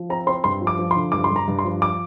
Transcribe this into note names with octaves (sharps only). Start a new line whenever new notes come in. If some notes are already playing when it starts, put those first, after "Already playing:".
Already playing: F3
C4 A#5
C4 C6
G2 C6
F3
D6
F3
C6
D3
G2 D6
C6
G2 A#5
G2
C6
F3
D6